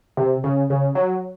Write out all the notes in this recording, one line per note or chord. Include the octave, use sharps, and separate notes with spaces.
C3
C#3
C#3
F#3